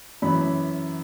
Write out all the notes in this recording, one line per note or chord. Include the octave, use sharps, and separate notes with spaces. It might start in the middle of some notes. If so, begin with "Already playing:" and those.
F#2 E3 B5